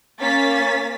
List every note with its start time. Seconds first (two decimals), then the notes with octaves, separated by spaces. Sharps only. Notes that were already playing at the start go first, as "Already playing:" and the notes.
0.20 A#3 C#4 A6 B6